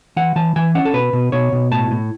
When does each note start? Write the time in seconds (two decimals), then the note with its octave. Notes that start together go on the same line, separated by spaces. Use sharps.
0.16 E3 F#5
0.36 E3 A5
0.56 E3 G#5
0.75 C#4 F#5
0.85 A4
0.93 B2 B4
1.13 B2
1.32 B2 C#5
1.52 B2
1.71 A2 A5
1.91 A2